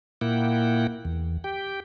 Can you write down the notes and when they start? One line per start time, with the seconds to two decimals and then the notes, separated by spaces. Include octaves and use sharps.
0.21 A#2 A#3 E4 F#5 G5
1.05 E2
1.44 G4 G5